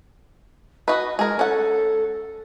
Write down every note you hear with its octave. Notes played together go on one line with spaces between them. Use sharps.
F#4 B4 D#5
G#3 G#4 A#4
C#4 A4 F#5